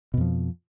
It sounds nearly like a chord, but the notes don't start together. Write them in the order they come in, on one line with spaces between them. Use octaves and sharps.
B2 F2 F3